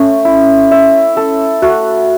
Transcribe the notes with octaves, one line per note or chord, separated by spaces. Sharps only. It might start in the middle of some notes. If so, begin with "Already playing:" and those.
Already playing: A3 C#4
E4
E5
A4
A3 F#4